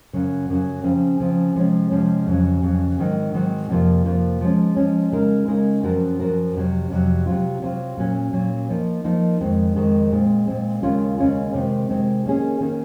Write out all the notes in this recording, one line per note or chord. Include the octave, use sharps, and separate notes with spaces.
F#2 C#3 F#3
F#2 C#3 F#3
C#3 F3 C4
C#3 F3 C4
C3 F3 G#3 C#4
C3 F3 G#3 C#4
F2 C#3 F#3
F2 C#3 F#3
G#2 D#3 F#3 C4
G#2 D#3 F#3 C4
F2 C3 F3 A#3 F4
F2 C3 F3 A#3 F4
F3 G#3 C#4
F3 G#3 C#4
C#3 G#3 D#4 A#4
C#3 G#3 D#4 A#4
F#2 F3 C4 F#4 A#4
F#2 F3 C4 F#4 A#4
F2 C3 D#3 F#3
F2 C3 D#3 F#3
C3 F#3 C4 F4
C3 F#3 C4 F4
A#2 F#3 C#4
A#2 F#3 C#4
F3 A#3 D#4
F3 A#3 D#4
F2 D#3 G#3 C4
F2 D#3 G#3 C4
A#2 G#3 C4
A#2 G#3 C4
D#2 C#3 G#3 C#4 F4
D#2 C#3 G#3 C#4 F4
C3 D#3 G#3 C4
C3 D#3 G#3 C4
D#3 A#3 C#4 G#4
D#3 A#3 C#4 G#4